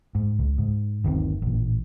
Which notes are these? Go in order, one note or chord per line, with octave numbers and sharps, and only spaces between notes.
G#2
C#2
G#2
G1 D#2 D#3 C4
A1 A#2